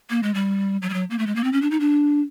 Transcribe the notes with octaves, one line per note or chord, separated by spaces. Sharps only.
A#3
G#3
G3
F#3
G3
F#3
A#3
A3
G#3
A#3
C4
C#4
D4
D#4
D4